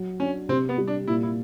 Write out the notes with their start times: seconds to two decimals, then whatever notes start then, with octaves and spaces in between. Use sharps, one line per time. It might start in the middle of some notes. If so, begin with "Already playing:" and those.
Already playing: F#3
0.20 C#4 D4
0.48 C3 C4
0.69 B3
0.78 G3
0.88 D4
1.08 A#2 E4
1.23 E4